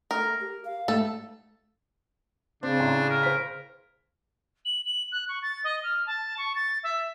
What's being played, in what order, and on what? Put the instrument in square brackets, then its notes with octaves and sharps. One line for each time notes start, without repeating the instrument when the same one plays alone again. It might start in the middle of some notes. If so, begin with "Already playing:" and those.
[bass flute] A3 [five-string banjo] A#4
[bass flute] G4
F5
[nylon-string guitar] A3 [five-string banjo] A4
[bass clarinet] C#3 [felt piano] C4 [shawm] D4
[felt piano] A1 A#5 C6
[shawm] A#4
[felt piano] C5 B6
[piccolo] F#7
F#7
F#6
C#6
A6
D#5
F6
A5
C#6
A6
E5